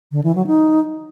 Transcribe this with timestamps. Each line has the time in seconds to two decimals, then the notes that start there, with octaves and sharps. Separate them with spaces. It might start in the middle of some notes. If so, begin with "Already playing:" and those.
0.12 D3
0.23 E3
0.35 F#3
0.47 D#4